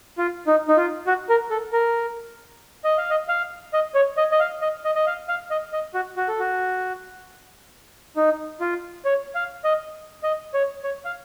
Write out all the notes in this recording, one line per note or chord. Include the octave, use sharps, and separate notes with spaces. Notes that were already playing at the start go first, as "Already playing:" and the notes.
F4
D#4
D#4
F4
F#4
A#4
A4
A#4
D#5
F5
D#5
F5
D#5
C#5
D#5
D#5
F5
D#5
D#5
D#5
F5
F5
D#5
D#5
F#4
F#4
A4
F#4
D#4
F4
C#5
F5
D#5
D#5
C#5
C#5
F5